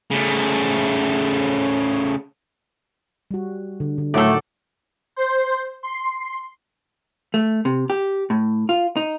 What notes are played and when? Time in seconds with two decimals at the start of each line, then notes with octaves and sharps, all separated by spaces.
0.11 C#3 A3
3.31 G3 F#4
3.80 D3
3.98 D3
4.14 A2 D#3 F#3 A3 A4 D5
5.16 C5
5.83 C6
7.34 A3
7.65 C3
7.90 G4
8.30 A2
8.69 F4
8.97 D#4